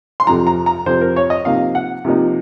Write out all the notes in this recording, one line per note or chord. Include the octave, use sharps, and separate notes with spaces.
C6
F2 C3 F3 A#5
A#5
A#5
F2 C3 F3 C5
A#4
C#5
D#5
C3 F3 A#3 D#4 F5
F#5
C3 F3 A#3 D#4